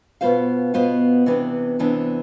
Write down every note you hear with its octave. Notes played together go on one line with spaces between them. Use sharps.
B2 B3 F4 C5 F5
B2 B3 F4 C5 F5
C3 E3 B3 D4
C3 E3 B3 D4